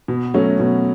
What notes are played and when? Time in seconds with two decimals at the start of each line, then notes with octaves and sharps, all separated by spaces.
0.08 B2
0.34 F#3 A3 C#4
0.60 B2